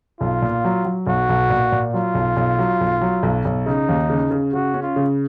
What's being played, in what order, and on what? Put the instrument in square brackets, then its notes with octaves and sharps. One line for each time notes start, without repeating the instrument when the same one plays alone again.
[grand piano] B1 [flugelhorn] F4
[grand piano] A#2
F#3
F#3
[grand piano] B1 [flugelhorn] F#4
[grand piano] B1
A#2
A#2
[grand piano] F#3 [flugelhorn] F4
[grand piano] B1
B1
F#3
B1
F#3
B1
B1
[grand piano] C#3 [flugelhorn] D#4
[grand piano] D#2
C#3
C#3
[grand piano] C#3 [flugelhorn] F#4
[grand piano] C#4
[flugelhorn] F4
[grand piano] C#3